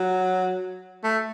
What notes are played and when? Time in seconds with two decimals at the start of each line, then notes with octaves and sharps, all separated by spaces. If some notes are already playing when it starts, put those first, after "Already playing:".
Already playing: F#3
1.04 A3